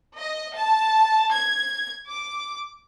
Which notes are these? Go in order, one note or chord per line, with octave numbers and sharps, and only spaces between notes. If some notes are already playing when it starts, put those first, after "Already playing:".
D#5
A5
G#6
D6